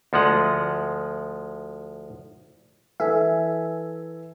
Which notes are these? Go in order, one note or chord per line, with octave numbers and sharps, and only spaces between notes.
D2 F3 G#3 F#5
E3 A4 E5 G#5